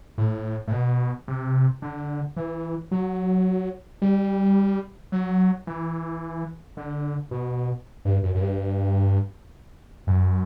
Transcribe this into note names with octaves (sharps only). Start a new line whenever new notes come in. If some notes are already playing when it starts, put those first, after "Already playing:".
A2
A2
B2
C3
D3
E3
F#3
G3
F#3
E3
D3
B2
G2
F#2
F#2
G2
F#2